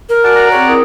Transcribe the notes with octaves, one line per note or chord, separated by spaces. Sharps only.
A#4
F#4 D5 F#5 G#5 A5 D6
D5 F#5 A#5
C4 G#4 C#5 G5
E4 A#4 D#6